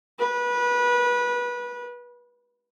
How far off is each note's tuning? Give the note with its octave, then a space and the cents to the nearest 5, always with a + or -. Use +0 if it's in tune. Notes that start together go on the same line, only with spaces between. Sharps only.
B4 -25